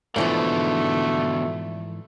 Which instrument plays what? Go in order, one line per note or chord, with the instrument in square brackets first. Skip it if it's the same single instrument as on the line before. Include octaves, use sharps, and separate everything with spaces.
[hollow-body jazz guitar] G#2 E3 F3 [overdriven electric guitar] B2 D3 [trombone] A3